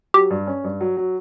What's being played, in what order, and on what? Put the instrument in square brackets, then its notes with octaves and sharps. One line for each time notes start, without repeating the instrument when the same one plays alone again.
[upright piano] F#3 [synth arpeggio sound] G4
[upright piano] G2
C#4
G2
F#3
F#3